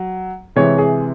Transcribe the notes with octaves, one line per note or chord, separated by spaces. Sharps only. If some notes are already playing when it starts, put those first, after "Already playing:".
Already playing: F#3
C3 E3 G#3 C#5
G#4